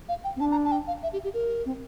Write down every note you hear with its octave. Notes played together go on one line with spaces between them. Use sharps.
F5
G5
C4
D4 A5
A#5
A5
G5
F5
E5
G4
G4
A#4
C4